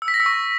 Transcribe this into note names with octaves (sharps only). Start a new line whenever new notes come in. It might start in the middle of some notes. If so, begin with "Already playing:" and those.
E6
B6
A#6
E6
C#6